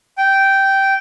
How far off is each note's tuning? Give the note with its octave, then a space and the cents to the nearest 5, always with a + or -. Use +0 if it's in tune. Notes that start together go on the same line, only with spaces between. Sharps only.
G5 -10